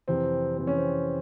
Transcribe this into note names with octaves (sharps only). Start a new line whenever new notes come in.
F2 C3 E3 C4
F2 C3 E3 C4
C#4
C4